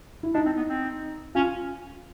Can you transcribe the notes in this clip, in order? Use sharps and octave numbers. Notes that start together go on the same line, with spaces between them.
E4
D4 D#4
C4
B3
C4
C#4 F4